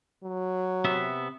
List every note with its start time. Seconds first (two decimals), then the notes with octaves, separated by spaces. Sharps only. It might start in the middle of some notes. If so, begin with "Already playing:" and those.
0.24 F#3
0.85 C3 B3 E5